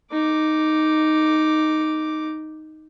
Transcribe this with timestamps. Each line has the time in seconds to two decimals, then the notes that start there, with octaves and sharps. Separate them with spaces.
0.12 D#4 D6